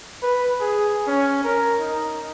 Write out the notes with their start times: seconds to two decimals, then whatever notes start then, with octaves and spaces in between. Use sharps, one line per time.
0.23 B4
0.60 G#4
1.07 C#4
1.44 A#4
1.79 D#4